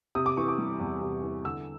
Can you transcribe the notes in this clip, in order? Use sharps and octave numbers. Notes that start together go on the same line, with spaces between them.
C3 D#6
D6
E3 C#6
D6
G3
E2
C3
E3
D3 E6